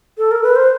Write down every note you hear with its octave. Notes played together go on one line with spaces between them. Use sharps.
A4
A#4
B4
C5